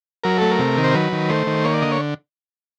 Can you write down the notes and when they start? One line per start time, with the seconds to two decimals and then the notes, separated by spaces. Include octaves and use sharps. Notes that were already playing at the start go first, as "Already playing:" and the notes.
0.24 F#3 A#4
0.38 A3 A4
0.51 A#4
0.59 C3
0.77 D#3
0.84 C5
0.94 F#3 B4
1.12 D#3
1.30 A3 C5
1.47 D#3
1.64 A#3 C#5
1.74 D5
1.82 D3 D#5
1.92 C#5